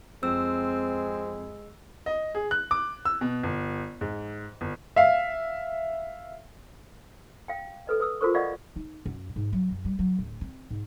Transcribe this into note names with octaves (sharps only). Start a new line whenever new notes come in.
F2 G#3 C4 E6
D#5
G#4
F#6
D6
E6
B2
G1
G#2
G1
E5 F5
F5 G5
A4 B4 D#5
B4 D#6 E6
F4 F#4 A4 A#4 C5 C#6
D5 D#5 F5 F#5 B5 C#6
D#4
F#2
G#2
F#3
F#2
G3
F#3
D1
C4
G#2